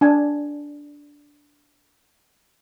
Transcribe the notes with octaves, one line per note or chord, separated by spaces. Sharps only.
D4 G#5